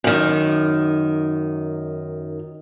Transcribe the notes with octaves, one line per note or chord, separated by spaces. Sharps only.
F#2 D#3